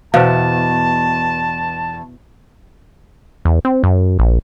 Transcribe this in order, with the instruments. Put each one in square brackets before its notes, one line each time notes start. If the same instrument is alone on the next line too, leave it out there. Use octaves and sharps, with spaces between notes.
[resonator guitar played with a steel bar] E2 [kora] B2 [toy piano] C5 F5 [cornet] A5
[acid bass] E2
C4
F#2
A#1